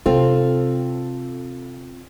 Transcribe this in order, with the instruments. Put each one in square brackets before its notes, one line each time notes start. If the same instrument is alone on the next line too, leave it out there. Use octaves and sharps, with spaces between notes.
[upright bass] C3 [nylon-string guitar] C4 F4 [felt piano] A4